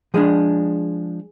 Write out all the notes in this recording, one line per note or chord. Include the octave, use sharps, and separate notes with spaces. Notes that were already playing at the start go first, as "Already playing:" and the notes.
F3 G#3 D4 G#4